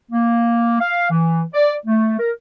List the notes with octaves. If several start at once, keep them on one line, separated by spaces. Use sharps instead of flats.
A#3
F5
E3
D5
A3
A#4